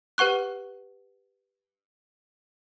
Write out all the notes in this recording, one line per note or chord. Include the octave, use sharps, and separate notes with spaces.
G4 B4 F#5 C#6 F#6